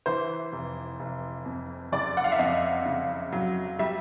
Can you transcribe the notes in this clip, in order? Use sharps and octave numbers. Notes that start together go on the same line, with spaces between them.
E3 C5
F1
F1
F2
F#1 D5
F#5
F5
E5
F2 D#5
C#3
F#3
G3 E5